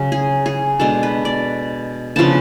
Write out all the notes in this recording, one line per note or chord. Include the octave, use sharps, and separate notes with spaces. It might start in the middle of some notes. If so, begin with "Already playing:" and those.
Already playing: C#3 F#3 C#4
G#4
G#4
B2 G#3 D4 A4
B4
D5
C#3 F3 B3 D4 A5